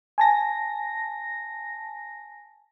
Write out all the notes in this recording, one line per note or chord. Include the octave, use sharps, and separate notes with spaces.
G#5 A5 A#6